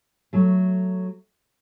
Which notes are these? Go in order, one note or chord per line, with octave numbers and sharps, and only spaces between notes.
F#3 A3